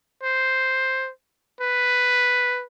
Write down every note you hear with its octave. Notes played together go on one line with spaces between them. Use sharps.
C5
B4